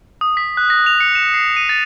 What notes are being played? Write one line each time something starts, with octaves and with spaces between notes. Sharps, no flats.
D#6
B6
F#6
A#6
F7
C#7
E7
C7
D#7
A6